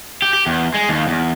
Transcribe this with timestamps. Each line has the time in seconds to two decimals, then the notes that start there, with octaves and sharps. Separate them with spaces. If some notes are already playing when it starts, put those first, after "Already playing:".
0.22 G4
0.33 G4
0.47 E2
0.74 G#3
0.89 D#2
1.08 E2